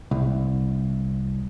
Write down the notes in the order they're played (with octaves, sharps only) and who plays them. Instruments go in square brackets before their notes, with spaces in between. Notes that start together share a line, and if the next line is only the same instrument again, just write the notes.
[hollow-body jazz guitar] C2